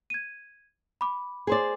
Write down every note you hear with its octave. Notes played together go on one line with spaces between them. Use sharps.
G#6 D#7
B5 D6
G#4 C5 D5